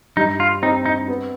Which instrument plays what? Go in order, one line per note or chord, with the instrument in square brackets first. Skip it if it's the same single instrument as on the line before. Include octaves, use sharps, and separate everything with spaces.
[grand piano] G2 [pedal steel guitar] D#4
[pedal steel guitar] F4
[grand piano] C4 [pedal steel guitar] D#4
[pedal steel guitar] D#4
[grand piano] B3